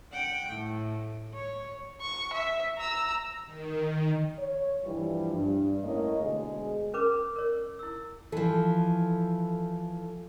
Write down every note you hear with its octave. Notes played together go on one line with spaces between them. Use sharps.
F#5 G5
A2
C#5
C#6
E5
A#5 E6
D#3
C#5
G2 E3 F3 G3
G2
A2 A#3 C#4 C#5 D#5
D2 B2 G#3 G#4
C#4 A#4 B4 D6
A#4 C#5
E4 E6
E3 F3 A4